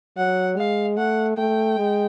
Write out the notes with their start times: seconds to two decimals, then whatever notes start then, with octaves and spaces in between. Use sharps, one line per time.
0.17 F#3 F#5
0.57 G#3 F5
0.97 A3 F#5
1.37 A3 G5
1.78 G#3